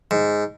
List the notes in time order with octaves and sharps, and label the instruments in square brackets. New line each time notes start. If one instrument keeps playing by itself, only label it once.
[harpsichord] G#2